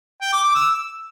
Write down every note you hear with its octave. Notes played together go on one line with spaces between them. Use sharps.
G5
D6
D6
E6